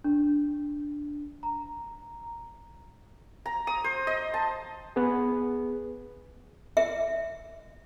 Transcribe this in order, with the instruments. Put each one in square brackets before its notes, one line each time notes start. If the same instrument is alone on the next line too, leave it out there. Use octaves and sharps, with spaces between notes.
[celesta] D4
A#5
[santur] A#5
D#6
C5
D#5
A5
[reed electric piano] B3 G#4
[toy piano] E5